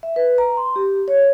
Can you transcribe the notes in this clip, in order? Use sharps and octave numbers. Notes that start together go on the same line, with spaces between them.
E5
B4
A#5
C6
G4
C#5